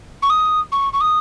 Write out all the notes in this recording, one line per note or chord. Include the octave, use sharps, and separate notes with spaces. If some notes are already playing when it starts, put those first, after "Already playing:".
C#6
D#6
C#6
C#6
D#6